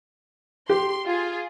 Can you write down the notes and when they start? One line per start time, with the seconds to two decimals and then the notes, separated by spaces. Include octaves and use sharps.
0.69 G4 C6
1.06 F4 G#4